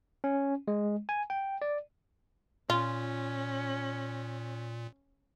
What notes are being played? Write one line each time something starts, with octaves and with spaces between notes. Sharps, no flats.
C#4
G#3
G#5
G5
D5
A#2 C#4 F4